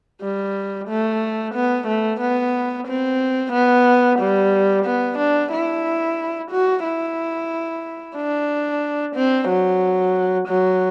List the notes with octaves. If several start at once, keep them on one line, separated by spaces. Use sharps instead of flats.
G3
A3
B3
A3
B3
C4
B3
G3
B3
D4
E4
F#4
E4
D4
C4
F#3
F#3